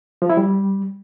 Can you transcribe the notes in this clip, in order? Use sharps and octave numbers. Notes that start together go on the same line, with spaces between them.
F3
E4
G3